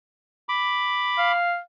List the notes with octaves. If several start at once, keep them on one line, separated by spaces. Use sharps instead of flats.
B5 D6
F5